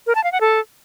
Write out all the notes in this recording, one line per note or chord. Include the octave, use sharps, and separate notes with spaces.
A#4
A5
F5
F#5
A4